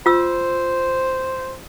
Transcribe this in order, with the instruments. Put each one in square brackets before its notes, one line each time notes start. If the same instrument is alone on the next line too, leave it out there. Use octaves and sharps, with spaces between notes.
[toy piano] F4 E6 [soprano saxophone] C5